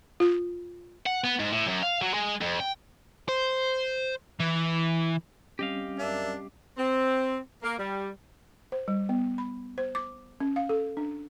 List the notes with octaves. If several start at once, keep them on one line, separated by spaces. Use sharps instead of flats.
F4
F#5
B3
G#2
A2
F#2
F5
F#3
G#3
F2
G5
C5
E3
G3 C4 C#4 G4 D#5 F5
F#2 D4 A#4 E5
C4
A#3
G3
C5
G3
B3
B5
C5
D6
C#4
F5
A4
D4